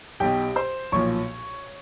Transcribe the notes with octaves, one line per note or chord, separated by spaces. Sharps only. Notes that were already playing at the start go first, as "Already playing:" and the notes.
B1 B2 G4 G5
C5 C6
B1 A#2 F3 C#5 C#6